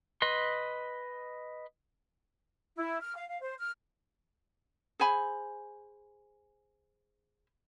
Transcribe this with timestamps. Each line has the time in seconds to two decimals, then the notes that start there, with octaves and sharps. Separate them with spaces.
0.22 B4 D#5 C6
2.75 E4
3.00 F6
3.16 F5
3.29 F5
3.40 C5
3.59 F6
5.00 G#4 C5 G#5 B5